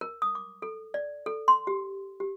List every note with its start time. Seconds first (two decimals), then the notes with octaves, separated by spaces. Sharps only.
0.01 A#4
0.22 D#6
0.35 D6
0.62 A4
0.94 D5
1.26 A4
1.48 C6
1.67 G4
2.20 G4